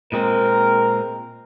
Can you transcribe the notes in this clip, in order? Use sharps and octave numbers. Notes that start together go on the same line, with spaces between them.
A#2 G#3 C4 A#4